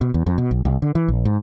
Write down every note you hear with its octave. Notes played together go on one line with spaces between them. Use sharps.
B2
E2
F2
B2
B1
C2
D3
E3
A#1
G#2